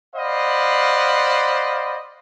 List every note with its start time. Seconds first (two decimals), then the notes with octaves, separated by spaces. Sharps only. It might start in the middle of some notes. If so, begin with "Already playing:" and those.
0.16 C5 D5 D#5 F5 F#5 B5